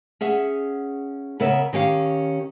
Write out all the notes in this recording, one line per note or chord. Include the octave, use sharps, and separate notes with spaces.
C#4 G#4 E5 F#5
C#3 B3 A#4 C#5 E5
D#3 C#4 G4 F5